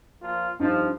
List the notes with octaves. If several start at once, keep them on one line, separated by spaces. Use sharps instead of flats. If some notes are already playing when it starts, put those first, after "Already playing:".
A#2 F3 F4
C2 G2 F3 D#4